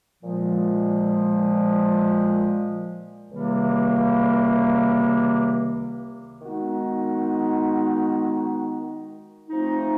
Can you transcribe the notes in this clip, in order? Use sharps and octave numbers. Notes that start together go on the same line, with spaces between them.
A#2 F3 G#3
C#2 C3 D#3 G3 A#3
D#3 G#3 B3 D#4 F#4
F3 A3 C4 D#4